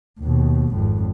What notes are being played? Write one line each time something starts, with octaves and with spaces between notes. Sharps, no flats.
D#2 B2
G#1 F2